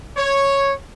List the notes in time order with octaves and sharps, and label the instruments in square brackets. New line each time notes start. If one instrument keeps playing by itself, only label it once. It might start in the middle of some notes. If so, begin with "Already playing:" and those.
[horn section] C#5